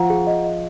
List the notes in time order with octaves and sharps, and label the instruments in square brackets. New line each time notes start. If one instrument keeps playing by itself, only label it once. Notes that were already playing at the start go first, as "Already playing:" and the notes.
Already playing: [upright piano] F3 [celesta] F#5 A#5
[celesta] G#4
D#5
D#5